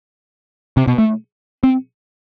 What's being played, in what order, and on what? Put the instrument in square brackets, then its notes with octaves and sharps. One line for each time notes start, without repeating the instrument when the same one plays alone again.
[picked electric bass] C3
B2
A3
C4